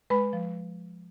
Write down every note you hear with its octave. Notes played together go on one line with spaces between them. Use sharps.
G#3 B4 B5
F3